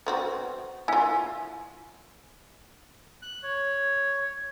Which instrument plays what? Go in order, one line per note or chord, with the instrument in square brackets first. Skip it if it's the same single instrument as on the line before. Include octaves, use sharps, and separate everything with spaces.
[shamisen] B3 C4 F#4
[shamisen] E4 F4 [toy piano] F5 G#5
[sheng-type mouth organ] F#6
C#5